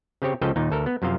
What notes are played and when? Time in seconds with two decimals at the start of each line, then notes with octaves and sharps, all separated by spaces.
0.22 C#3 C4 G4 C#5
0.41 C#2 C#3 F3 A4 D#5 G5
0.56 D#2 A#2 D#4
0.70 D2 A4 A#4
0.86 B3
1.02 F#2 C3 F3 C5 F5